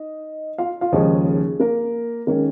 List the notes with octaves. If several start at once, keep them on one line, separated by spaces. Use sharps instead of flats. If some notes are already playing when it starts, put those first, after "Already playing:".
Already playing: D#4 D#5
F4 F5
F4 F5
D#2 C#3 F3 G#3 C#4 D#4 D#5
G#4
A#3 A#4
D#3 G#3 A#3 C#4 A#4